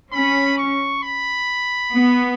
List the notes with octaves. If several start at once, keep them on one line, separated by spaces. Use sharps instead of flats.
C#4 B5
C#6
B5
B3